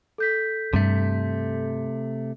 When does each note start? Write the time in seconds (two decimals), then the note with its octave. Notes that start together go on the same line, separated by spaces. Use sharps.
0.18 A4 G6 B6
0.74 G2 C3 A3